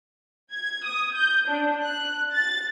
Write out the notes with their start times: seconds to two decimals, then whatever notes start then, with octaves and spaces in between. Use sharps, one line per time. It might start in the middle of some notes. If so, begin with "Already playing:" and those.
0.51 G#6
0.84 D#6
1.14 G6
1.46 D4
1.83 F#6
2.32 A6